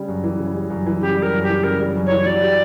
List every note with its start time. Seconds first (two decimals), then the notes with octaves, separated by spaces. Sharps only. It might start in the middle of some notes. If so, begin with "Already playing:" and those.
Already playing: C#3 G3
0.08 F#2
0.23 E3
0.39 C#3
0.54 G3
0.70 F#2
0.86 E3
1.01 C#3 G4
1.17 G3
1.22 A#4
1.33 F#2
1.43 G4
1.48 E3
1.64 C#3 A#4
1.80 G3
1.96 F#2
2.06 E3 C#5
2.26 F#3 D5
2.42 G4